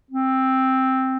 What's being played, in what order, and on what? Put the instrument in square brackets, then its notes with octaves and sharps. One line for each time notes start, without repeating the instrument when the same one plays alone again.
[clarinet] C4